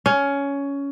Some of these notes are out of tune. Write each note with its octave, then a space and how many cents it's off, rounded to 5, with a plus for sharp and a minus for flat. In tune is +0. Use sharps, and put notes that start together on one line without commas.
C#4 +15